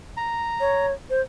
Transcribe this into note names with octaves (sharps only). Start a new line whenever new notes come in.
A#5
C#5
C5